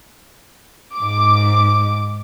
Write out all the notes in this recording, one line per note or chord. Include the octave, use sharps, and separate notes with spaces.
G#2 D6